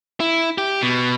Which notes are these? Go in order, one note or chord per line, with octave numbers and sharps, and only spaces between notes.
E4
G4
B2